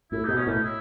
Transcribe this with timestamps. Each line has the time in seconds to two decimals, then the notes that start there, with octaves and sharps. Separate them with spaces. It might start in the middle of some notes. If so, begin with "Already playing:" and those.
0.12 A2 E4
0.24 B2 D#4
0.37 C#4
0.47 A2 D#4
0.64 E4